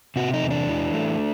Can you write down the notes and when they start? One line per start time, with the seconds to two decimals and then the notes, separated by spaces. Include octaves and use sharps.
0.16 C3 F#4
0.34 D#4
0.42 E2
0.50 D4
0.69 E3
0.94 A3